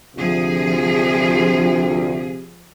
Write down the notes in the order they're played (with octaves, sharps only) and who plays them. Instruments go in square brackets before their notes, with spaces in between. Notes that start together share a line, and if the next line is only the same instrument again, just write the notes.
[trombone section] D2 F4 [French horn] C3 [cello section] F3 G#4